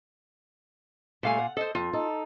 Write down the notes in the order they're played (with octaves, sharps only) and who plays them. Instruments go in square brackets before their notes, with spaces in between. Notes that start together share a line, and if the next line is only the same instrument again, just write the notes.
[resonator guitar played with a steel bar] A#2 F5 G#5 [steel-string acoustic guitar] G3 A3
[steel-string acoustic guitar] F#5
[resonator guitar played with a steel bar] A4 C5 [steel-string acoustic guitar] D#5
[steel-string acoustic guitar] F2 [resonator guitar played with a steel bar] F4
[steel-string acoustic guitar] D#4 A4